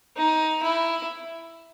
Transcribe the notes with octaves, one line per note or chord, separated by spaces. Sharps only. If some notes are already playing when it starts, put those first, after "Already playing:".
D#4
E4